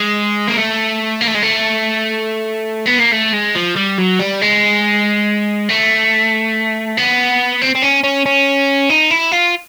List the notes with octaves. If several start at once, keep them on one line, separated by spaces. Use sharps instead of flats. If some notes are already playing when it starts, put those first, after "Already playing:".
Already playing: G#3
A#3
A3
A#3
A3
G#3
A3
B3
A#3
A3
G#3
F3
G3
F#3
G3
G#3
A3
B3
C4
C4
C#4
C#4
C#4
D#4
E4
F4